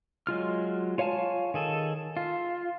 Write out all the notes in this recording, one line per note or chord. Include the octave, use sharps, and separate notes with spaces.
F#3 G#3 F4 F6
F4 C#5 F5 G#5 A5
D#3 G#4 A4
F4